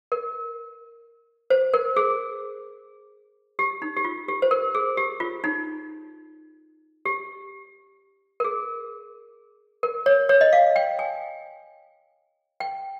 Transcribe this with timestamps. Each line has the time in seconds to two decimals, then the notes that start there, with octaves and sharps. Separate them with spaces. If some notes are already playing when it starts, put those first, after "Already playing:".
0.12 A#4
1.50 C5
1.74 A#4
1.97 G#4
3.59 G4
3.82 D#4
3.97 G4
4.05 F4
4.28 G4
4.42 C5
4.51 A#4
4.75 G#4
4.97 G4
5.20 F4
5.44 D#4
7.05 G4
8.40 A#4
8.44 G#4
9.83 A#4
10.06 C#5
10.29 C#5
10.41 D#5
10.53 F5
10.76 G5
10.99 G#5
12.60 G5